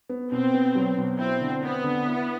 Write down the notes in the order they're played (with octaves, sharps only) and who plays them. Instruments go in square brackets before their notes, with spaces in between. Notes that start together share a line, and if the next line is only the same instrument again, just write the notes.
[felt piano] B3
[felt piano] B2 [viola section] C4
[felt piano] B3
F#3
B2
[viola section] C4 [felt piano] E4
[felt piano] D3
[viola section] B3 [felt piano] C4
[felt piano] D3
E4